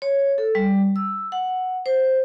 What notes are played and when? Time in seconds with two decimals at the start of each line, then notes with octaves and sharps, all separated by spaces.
0.02 C#5
0.38 A4
0.55 G3
0.96 E6
1.32 F#5
1.86 C5